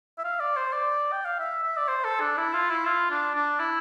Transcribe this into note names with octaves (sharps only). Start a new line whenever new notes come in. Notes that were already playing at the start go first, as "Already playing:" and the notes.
E5
F5
D5
C5
D5
G5
F5
E5
E5
D5
C5
A4
D4
E4
F4
E4
F4
D4
D4
E4